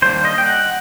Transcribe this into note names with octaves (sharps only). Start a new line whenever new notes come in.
D#3 G3 A#3 D4 C5
D#5
G5
F#5